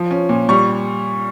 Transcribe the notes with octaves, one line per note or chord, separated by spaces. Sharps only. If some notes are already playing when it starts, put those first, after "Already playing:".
Already playing: F3
C#4
A#2
G3 C#6